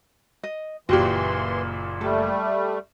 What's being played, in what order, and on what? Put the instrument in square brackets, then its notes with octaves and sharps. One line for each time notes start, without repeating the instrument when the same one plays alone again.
[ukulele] D#5
[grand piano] F#1 A#2 [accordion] E3 C6 [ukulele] F#4 G4
[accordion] G3 A3 [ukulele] A4